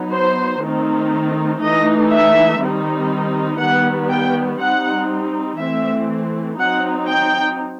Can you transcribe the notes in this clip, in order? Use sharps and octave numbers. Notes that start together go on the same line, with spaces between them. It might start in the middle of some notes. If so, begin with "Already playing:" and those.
Already playing: F#3 B3 D#4
C5
D#3 A3 C4 D#4
E3 A3 D#4 D#5
E5
D#3 G3 C4 D#4
D#3 G3 B3 F#5
G5
G3 C4 D#4 F#5
E3 A3 C4 E5
F#3 C4 D#4 F#5
G5